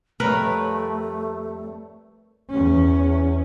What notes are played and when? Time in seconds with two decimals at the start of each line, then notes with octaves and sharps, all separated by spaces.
0.20 F2 G3 A3 A#4 B4 C#5
2.50 E2 C#4